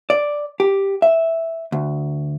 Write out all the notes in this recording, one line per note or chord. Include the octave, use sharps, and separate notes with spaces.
D5
G4
E5
D2